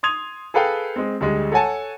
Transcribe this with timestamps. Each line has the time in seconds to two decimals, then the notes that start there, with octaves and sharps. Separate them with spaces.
0.03 C6 D#6 G#6 F7
0.54 G#4 A4 B4 F5 G5
0.96 G#3 C4
1.20 D2 G3 G#3
1.52 A4 C#5 F#5 G#5 A5